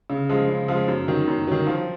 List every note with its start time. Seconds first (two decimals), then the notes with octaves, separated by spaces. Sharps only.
0.10 C#3
0.29 F3 G#3
0.49 C#3
0.68 F3 G#3
0.88 F#2
1.08 D#3 F#3
1.28 F#2
1.47 D#3 F#3
1.66 F3